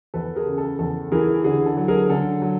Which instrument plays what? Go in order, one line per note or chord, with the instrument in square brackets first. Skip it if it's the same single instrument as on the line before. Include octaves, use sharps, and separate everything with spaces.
[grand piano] E2 A4 B4
G#4 A#4
C#3
A4
E2 A4
E3 G#4 A#4
D3 G#4
A4
F#3
G#4 A#4
D3 A4
F#3